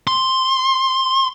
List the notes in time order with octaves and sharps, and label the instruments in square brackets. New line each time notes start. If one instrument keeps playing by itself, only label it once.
[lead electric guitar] C6